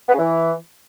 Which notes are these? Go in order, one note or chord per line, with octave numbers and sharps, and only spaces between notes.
B3
C#3
E3